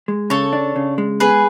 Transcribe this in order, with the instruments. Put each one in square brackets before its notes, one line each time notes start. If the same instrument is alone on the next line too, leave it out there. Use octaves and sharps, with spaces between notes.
[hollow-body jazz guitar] G#3
[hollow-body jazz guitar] C#3 [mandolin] A4 C#5
[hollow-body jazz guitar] D4
C#3
G#3
[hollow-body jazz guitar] B3 [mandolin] G#4 B4